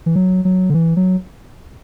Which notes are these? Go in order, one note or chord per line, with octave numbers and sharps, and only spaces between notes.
E3
F#3
F#3
D3
E3
F#3